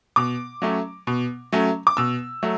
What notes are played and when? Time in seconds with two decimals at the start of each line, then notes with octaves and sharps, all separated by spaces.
0.16 B2 D6
0.62 F#3 A3 C#4
1.07 B2
1.52 F#3 A3 C#4
1.87 D6
1.97 B2 E6
2.43 F#3 A3